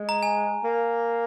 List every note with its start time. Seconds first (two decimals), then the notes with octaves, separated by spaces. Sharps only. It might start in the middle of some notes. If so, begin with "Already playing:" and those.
Already playing: G#3
0.09 A#5
0.23 G#5
0.64 A#3